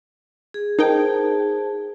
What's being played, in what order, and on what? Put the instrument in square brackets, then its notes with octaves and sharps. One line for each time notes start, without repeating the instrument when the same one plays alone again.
[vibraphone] G#4
[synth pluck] D#4 A#4 G5 [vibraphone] G#4 C5 A5